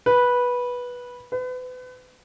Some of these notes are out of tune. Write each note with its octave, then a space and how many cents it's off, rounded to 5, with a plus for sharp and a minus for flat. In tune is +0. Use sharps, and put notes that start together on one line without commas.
B4 -10
B4 +35